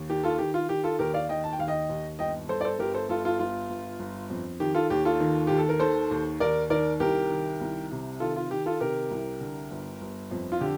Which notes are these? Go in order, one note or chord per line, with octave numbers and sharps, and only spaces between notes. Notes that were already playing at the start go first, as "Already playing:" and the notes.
Already playing: D#2
D#3 G4
F4 A4
D#3 G4
F4
D#3 G4
F4 A4
D#2 G4 A#4
D5 F5
D#3 D#5 G5
A5
G5
D#2 F5
D#5 G5
D#2
G1 D#5 G5
G1 A4 C5
D5
A4 C5
G1 G4 A#4
A4 C5
G1 F4 A4
F4 A4
G1 F4
G1
G1
F2
D#3 G4
F4 A4
D#2 G4
F4 A4
D#3
D#2 G4
A4
A#4
D#3 A4 C5
D#2
D#2 A#4 D5
D#3 A#4 D5
C2 G4 A#4
D#3
C2
C3
D#3 F4 A4
F4
D#3 G4
F4 A4
C3 G4 A#4
C2
D3
G1
G1
F2
F4
D3 G4